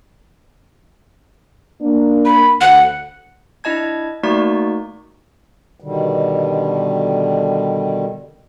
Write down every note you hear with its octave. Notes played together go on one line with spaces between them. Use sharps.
A#3 D4
B5
D2 F#5
D4 E4 D#5 A5 G#6
A3 A#3 D#4 F#4 D5 C#6
B2 D3 D#3 G3